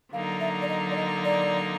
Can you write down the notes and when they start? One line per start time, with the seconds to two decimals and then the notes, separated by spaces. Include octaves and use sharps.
0.13 D3 F#3 A#3 D#4 F5
0.40 E5
0.62 D5
0.68 D#5
0.91 D5
0.96 D#5
1.24 D5